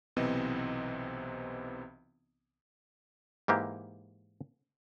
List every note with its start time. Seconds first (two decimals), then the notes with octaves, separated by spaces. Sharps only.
0.16 B1 C3 E3 B3 C4 D#5
3.48 G#2 E3 A#3 G4